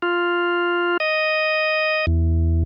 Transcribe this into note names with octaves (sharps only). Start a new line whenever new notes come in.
F4
D#5
E2